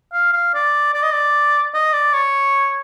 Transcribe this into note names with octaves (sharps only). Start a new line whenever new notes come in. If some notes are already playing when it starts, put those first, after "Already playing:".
F5
F5
D5
D5
D#5
D5
D#5
D5
C#5